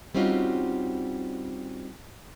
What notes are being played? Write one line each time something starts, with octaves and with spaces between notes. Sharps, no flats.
G3 C4 C#4 D#4 F4 F#4